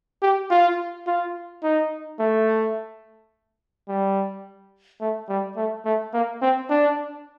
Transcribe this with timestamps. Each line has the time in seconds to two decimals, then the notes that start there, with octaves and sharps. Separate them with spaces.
0.22 G4
0.50 F4
1.07 F4
1.63 D#4
2.19 A3
3.88 G3
5.01 A3
5.29 G3
5.57 A3
5.85 A3
6.14 A#3
6.42 C4
6.70 D4